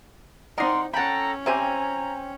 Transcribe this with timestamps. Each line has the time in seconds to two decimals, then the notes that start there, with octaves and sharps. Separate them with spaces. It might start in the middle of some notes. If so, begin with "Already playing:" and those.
0.58 C4 D#4 A#4 D5 D#5 F#5 C6
0.94 C#4 A4 F#5 G5 A#5 B5
1.46 C4 G4 C5 E5 G#5 A#5